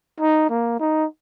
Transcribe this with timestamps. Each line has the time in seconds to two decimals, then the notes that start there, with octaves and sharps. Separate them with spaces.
0.21 D#4
0.50 A#3
0.80 D#4